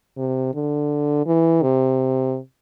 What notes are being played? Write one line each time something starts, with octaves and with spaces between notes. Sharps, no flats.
C3
D3
E3
C3